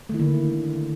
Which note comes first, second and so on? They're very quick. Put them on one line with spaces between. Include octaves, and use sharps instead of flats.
A3 D#3 E4 A#3 D3